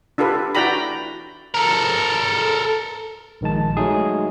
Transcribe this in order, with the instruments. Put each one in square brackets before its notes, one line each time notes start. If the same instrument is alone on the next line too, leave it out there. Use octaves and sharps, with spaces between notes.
[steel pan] D4 F4 G4 A4 B4
E4 F#4 D5 G5 A#5 B5
[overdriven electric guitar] A4 A#4
[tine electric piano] A#1 D#3 G#3 A5
F#3 G#3 A3 D#4 G#4